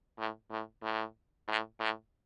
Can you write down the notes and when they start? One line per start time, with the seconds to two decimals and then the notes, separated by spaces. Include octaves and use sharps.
0.19 A2
0.51 A2
0.83 A2
1.48 A2
1.80 A2